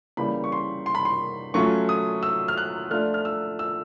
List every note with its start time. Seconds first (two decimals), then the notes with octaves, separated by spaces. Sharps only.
0.17 C#3 E3 G3 A#3 B5
0.44 C#6
0.52 C6
0.86 C6
0.95 B5
1.05 C6
1.54 F#3 A3 C#4 F4 C#6
1.89 D#6
2.23 E6
2.48 F6
2.57 F#6
2.91 F3 A3 D4 F4 F6
3.14 F6
3.25 E6
3.59 E6